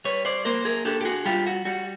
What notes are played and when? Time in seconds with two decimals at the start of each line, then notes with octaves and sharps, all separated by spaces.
0.05 G3 B4 C#5
0.25 C5 D5
0.45 A#3 A#4 C5
0.65 G#4 A#4
0.85 D4 G4 A4
1.01 G4
1.05 F#4 G#4
1.26 G3 F4 G4
1.46 F#4
1.65 G3 F#4